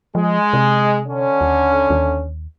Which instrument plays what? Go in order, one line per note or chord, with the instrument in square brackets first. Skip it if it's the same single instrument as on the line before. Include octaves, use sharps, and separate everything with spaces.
[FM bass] F3 [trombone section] G#3
[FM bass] C3
[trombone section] D3 C#4
[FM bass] D#2
D#2